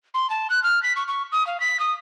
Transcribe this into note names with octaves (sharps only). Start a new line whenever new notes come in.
C6
A5
F#6
F6
B6
C#6
C#6
D#6
F5
B6
D#6